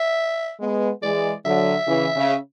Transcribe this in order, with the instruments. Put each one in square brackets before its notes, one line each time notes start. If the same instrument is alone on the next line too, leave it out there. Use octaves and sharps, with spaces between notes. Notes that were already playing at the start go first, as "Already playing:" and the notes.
Already playing: [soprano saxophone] E5
[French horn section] G#3 B3
[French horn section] E3 G#3 [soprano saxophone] D5
[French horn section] D3 F#3 [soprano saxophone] E5
[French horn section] C#3 E3
C#3